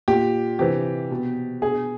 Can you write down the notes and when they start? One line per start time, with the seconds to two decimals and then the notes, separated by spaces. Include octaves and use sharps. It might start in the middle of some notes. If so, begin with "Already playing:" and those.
0.08 A#2 G4
0.59 C3 E3 G4
1.11 B2
1.62 B2 G#4